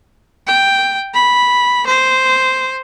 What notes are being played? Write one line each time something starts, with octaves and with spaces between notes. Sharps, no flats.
G5
B5
C5